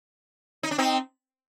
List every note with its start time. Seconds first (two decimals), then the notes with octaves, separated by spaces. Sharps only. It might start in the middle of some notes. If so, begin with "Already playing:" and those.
0.63 D#4
0.71 D4
0.78 C4 D#4